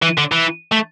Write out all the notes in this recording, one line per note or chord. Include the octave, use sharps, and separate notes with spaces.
E3
D3
E3
A3